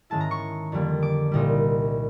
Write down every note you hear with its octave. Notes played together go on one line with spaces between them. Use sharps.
G#2 D#3 G#3 C#4 E4 A5
A#5
C#6
F2 D3 G3 A#3
D6
C2 A#2 G3 C4 D#4